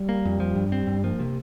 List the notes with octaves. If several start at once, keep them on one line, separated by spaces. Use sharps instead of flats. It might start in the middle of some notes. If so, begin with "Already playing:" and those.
Already playing: G3
A#3
F2
F3
G2
C4
G2
F3 A#3
C3